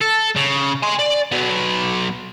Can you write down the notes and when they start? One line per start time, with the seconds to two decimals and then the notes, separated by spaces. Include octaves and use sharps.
0.01 A4
0.36 C#3
0.83 G#5 C6
0.99 D5
1.32 F#3 B3